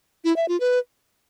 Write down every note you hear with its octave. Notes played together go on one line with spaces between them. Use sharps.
E4
E5
F4
B4